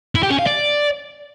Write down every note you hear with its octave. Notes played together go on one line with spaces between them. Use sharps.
E4
G4
C#4
F5
D5